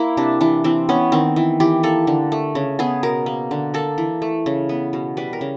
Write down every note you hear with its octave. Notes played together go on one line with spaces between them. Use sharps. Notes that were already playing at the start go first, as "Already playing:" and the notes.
Already playing: A#3 E4
C3 D4
E3 D4
E3 C4
B3 C#4
D#3 C4
E3
E3 G4
A#3 A4
D3
A3
C#3
B3 G#4
B2 A#4
A#3
D3
A#3 A4
E3
A3
C#3
B3
B2
G3 B4
A#4
C#3